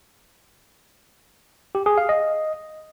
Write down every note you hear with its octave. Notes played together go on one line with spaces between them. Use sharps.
G4
G#4
F5
D#5